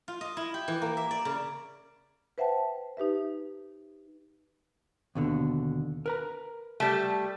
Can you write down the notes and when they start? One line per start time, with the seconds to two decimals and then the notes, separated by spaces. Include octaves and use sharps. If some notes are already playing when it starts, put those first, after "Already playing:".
0.08 F4
0.21 D#5
0.37 E4
0.54 G4
0.68 E3
0.82 A#3
0.97 E5
1.11 D5
1.25 C#3
2.38 B4 C5 E5 F#5 G5 A5
2.97 D#4 G4 B4 E5
5.15 D#2 B2 D3
6.06 A#4 B4 A#5
6.80 G3 A3